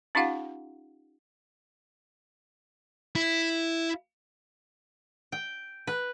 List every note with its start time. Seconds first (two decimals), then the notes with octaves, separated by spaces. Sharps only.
0.15 C#4 D#4 F4 G4 F5 F#5
3.15 E4
5.32 G5
5.87 B4